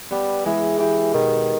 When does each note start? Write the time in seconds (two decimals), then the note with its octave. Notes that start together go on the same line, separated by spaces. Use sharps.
0.11 G3 B3
0.45 E3 G#3
0.79 E3 G4
1.14 B2 D#3